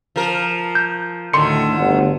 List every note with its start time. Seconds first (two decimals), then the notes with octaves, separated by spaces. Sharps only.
0.16 F3 A#4
0.75 G6
1.33 D2 A2 D3 D#3 C6 C#7
1.77 G1 D2 F#5